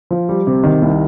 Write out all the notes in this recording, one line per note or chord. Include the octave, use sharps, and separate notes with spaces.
F3
G3
C3
D#3
C2